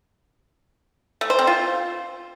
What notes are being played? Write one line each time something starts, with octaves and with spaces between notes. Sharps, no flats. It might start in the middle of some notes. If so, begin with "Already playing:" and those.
A3
C5
C4
F4